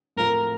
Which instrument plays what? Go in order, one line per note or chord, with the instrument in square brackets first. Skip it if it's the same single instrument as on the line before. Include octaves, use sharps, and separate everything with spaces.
[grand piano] A2 F3 A3 C4 F4 [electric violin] A#4